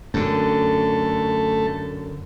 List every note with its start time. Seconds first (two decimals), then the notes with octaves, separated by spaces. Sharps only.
0.14 F#2 D3 A3 A4